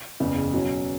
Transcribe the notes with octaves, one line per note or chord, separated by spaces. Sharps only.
F#1 E2 C#3
B2 F#3 C#4